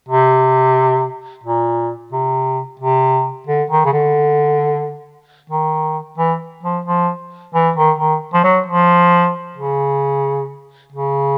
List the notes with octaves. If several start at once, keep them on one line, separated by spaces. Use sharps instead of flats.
C3
A#2
C3
C3
D3
D#3
C#3
D3
D#3
E3
F3
F3
E3
D#3
D#3
F3
F#3
F3
C#3
C#3